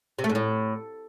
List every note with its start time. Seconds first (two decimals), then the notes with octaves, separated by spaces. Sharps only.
0.19 C3
0.24 A3
0.30 G#2
0.35 A2